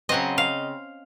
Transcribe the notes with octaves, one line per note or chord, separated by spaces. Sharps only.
C#3 F#3 C4 D#5
F5